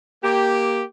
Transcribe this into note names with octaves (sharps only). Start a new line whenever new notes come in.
A#3 G4